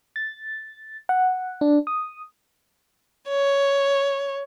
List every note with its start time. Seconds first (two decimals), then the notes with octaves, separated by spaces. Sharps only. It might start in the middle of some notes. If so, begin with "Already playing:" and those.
0.16 A6
1.09 F#5
1.61 D4
1.87 D#6
3.29 C#5